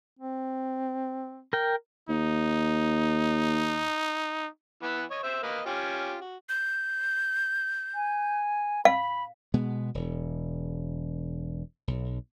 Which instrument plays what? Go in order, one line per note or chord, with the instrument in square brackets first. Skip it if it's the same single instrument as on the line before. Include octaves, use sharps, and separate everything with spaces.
[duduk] C4
[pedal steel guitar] A#4 G5
[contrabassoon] D#2 [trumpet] D#4
[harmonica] E3 B3 B4
C#5 D#5
C5 E5
A#3 B4 D#5
C#4 F4 G4
F#4
[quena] G6
[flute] G#5
[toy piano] F5 [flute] B5
[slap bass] B2 G#3 B3
E1
B1